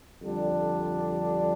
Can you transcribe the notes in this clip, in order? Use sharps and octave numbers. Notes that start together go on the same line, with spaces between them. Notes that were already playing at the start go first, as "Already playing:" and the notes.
F2 D3 G3 D4